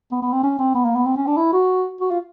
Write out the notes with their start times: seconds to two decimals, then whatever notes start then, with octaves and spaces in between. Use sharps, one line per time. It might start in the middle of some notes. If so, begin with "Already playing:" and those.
0.12 B3
0.22 B3
0.33 C4
0.43 C#4
0.59 C4
0.75 B3
0.85 A#3
0.96 B3
1.06 C4
1.17 C#4
1.27 D4
1.37 E4
1.53 F#4
2.01 F#4
2.11 F4